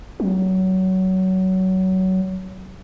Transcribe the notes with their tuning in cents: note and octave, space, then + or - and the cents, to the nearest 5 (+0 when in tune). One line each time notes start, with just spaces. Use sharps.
F#3 +20